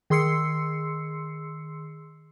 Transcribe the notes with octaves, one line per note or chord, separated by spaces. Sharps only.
D#3 G#4 C6 E6 C7 C#7